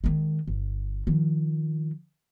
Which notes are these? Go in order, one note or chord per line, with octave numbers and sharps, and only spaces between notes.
D#3 G#3
G1
D#3 F3